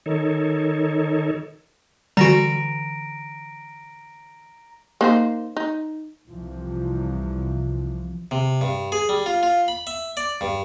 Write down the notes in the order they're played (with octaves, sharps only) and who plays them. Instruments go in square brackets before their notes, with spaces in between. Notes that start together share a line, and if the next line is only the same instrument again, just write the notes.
[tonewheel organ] D#3 D#4 A4 C#5
[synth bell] D3 E3 [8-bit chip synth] G3 F#4 [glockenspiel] A#5 A#6 D7
[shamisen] A#3 D#4 C5
D#4
[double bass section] C2 C3 E3 F3
[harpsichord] C3
G2
G#4
G3
F4
F4
B5
E5
D5
G2